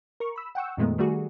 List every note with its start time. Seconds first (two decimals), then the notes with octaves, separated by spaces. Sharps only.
0.20 A#4 C#6
0.36 B5 E6
0.55 F#5 G5 C#6 E6
0.77 F2 A#2 D#3 G#3 A3 B3
0.98 D#3 G3 A3 F#4 G#4